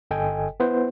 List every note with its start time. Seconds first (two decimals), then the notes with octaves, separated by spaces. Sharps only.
0.11 G1 A4 D#5 G5 G#5
0.60 B3 E4 B4 C5